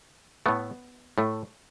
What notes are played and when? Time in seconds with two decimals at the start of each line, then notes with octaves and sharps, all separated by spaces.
0.46 A2 A3 B3
1.18 A2 A3